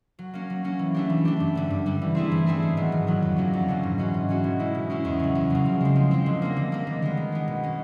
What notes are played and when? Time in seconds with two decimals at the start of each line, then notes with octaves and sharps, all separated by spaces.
0.19 F#3
0.34 A#3 C#4
0.50 F#3
0.64 A#3 C#4
0.79 E3
0.94 A3 D4 G4
1.10 E3
1.25 A3 D4 G4
1.40 G2
1.55 D3 G3
1.70 G2
1.86 D3 G3
2.02 E3
2.15 A3 C4 E4 G#4
2.32 E3
2.46 A3 C4 E4 G#4
2.62 G#2
2.77 D#3 F#3 B3
2.92 G#2
3.07 D#3 F#3 B3
3.22 F2
3.36 D3 F#3 A#3 C#4
3.53 F2
3.68 D3 F#3 A#3 C#4
3.83 G#2
3.98 E3 G#3 C#4 F#4
4.14 G#2
4.29 E3 G#3 C#4 F#4
4.44 B2
4.59 G#3 C#4 E4
4.75 B2
4.90 G#3 C#4 E4
5.05 E2
5.20 C#3 F#3
5.35 E2
5.50 C#3 F#3
5.65 F3
5.80 G#3 C4
5.96 F3
6.11 G#3 C4
6.26 D3
6.42 G3 A#3
6.56 D3
6.72 G3 A#3
6.87 D#3
7.02 G#3 B3
7.17 D#3
7.32 G#3 B3
7.48 B2
7.63 G#3 C#4